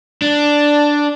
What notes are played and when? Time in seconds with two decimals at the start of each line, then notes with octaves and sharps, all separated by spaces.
0.22 D4